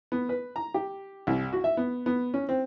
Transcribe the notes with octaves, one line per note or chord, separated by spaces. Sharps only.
B3
B4
A#5
G4
C2
F#4
E5
B3
B3
C#4
C4